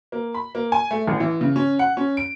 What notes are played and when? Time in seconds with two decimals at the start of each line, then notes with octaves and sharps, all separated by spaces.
0.12 A#3
0.34 B5
0.55 A#3
0.72 G#5
0.91 A3
1.08 A1
1.20 E3
1.41 C#3
1.56 C#4
1.79 F#5
1.97 C#4
2.17 D7